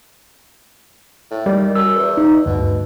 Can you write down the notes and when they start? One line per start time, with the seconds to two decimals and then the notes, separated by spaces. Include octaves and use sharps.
1.31 A2
1.46 D#3 G3
1.75 F#2 E6
1.95 E2
2.17 D#4
2.46 D2 G2 B2